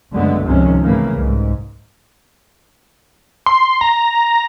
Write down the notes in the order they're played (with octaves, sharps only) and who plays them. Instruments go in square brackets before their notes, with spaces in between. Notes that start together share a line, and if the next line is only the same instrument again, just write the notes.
[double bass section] F#1 G2 D3 G#3 A3 B3
G#1 C#2 C3 D#3 F3 C#4
A2 C#3 E3 A3 A#3
C2 G#2
[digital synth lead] C6
A#5